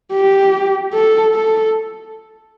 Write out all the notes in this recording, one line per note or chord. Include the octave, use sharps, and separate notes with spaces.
G4
A4
A4